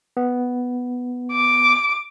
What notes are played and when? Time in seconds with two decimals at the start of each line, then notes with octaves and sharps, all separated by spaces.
0.17 B3
1.33 D6